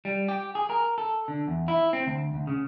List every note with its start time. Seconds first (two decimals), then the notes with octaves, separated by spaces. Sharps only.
0.05 G3
0.28 G4
0.55 G#4
0.70 A#4
0.98 A4
1.28 D3
1.48 E2
1.68 E4
1.93 C4
2.06 D2
2.34 D2
2.47 C#3